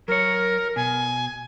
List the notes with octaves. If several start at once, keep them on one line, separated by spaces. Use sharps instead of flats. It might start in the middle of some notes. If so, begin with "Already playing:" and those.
F#3 A#4 C#5
B2 G#5